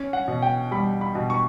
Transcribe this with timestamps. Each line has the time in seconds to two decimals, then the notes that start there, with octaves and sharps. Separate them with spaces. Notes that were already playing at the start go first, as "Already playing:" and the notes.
Already playing: C#4
0.13 F#5
0.28 B2
0.42 G5
0.71 G3 B5
1.01 B5
1.15 B2
1.30 C#6